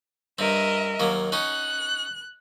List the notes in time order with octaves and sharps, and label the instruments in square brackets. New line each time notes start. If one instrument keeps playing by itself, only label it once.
[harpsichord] G2 C4 [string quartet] A#4 D#5 E5
[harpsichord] D#2 F#3 A#3
[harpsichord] C#4 D#4 F#4 [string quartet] F#6